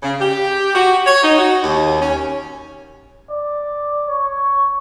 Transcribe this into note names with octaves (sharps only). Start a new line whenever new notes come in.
C#3
G4
F#4
C#5
D#4
F#4
D#2
C#4
D5
C#5